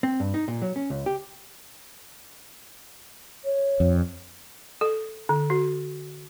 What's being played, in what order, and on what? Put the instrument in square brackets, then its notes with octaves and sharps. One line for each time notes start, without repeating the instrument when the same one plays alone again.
[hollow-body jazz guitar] C4
G2
D#4
A#2
F#3
C#4
C#2
G4
[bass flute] C#5
[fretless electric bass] F2
[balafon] A4
D3
F#4